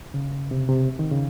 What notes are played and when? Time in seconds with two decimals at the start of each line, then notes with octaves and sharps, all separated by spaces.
0.14 C#3
0.51 C3
0.69 C3
0.99 D#3
1.11 C#3